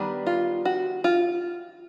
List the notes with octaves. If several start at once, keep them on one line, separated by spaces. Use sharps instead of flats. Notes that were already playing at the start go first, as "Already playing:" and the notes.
Already playing: D#3 G3 B3 D4
F4
F#4
F4